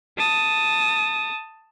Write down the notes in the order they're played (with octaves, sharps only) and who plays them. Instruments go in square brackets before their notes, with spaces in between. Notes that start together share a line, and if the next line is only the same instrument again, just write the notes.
[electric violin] A5 D#6